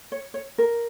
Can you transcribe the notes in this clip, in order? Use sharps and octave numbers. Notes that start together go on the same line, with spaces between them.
C#5
C#5
A#4